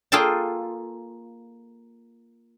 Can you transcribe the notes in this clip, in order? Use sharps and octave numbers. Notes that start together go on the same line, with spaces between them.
A#3 F4 G#4 A4 G5 A5